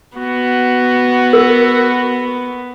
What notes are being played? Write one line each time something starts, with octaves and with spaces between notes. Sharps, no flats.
B3 F#4
A#4